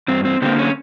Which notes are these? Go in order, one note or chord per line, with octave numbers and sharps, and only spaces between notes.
G2 C4
C4
D3 F#3 A#3 C4
C#4